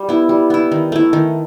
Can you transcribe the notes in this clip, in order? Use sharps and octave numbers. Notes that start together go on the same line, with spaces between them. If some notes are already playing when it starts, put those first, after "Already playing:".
Already playing: G3
B3 E4
G3
B3 E4
D#3
A3 E4
D#3